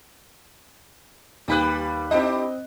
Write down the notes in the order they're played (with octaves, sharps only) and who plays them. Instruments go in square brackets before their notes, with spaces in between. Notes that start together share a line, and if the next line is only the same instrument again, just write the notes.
[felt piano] D#2 B5 F#6 [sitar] G3 G4 B4
[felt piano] C4 D#5 [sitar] D4 E4 G4